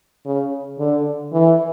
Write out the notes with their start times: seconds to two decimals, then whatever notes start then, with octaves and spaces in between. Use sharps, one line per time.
0.26 C#3
0.79 D3
1.33 E3